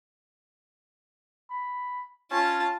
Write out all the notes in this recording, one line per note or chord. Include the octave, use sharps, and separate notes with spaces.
B5
C#4 F4 A5